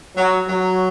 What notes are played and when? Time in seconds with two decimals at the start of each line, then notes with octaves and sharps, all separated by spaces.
0.17 F#3
0.48 F#3